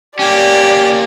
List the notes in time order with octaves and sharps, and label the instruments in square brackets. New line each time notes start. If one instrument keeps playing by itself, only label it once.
[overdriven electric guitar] A#3 C#4 [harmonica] G4 [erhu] D5